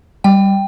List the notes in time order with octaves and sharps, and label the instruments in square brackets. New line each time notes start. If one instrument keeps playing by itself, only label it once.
[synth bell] G3 G5